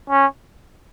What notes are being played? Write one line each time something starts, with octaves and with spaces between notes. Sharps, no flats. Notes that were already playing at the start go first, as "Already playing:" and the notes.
C#4